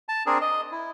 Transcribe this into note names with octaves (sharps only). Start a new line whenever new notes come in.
A5
C4 D4 G#4 A#4
D#5
E4